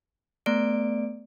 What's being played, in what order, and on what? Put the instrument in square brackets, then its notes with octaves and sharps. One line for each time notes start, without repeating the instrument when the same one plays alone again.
[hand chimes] A3 B3 D5 D7